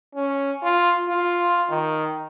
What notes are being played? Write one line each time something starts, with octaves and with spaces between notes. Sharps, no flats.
C#4
F4
F4
D#3